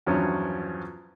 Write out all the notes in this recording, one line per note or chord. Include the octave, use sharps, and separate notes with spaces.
E2 G2 F3 F#3 C#4